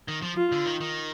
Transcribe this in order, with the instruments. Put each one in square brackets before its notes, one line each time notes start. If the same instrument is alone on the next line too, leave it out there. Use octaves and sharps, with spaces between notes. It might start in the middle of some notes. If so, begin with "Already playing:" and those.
[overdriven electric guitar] D#3
F3
[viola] F4
[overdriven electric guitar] D3
D#3
D#3